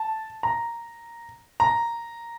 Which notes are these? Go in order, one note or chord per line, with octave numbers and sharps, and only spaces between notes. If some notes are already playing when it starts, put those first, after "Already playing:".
Already playing: A5
A#5
A#5